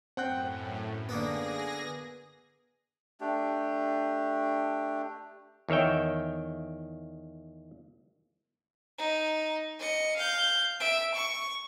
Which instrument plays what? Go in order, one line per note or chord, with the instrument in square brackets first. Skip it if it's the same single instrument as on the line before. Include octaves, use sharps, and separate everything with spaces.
[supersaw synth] F#2 A2 [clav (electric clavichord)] C4 [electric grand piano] F#5 G5 F#6
[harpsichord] D3 A#3 B3 [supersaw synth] G#4 A#6
[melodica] A3 D4 G4
[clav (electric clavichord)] E2 D#3 C#5 E5 G5
[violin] D#4
D#5 C#7
F5 G6
E5 D7
C#6